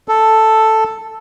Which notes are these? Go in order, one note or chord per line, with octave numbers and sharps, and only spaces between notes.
A4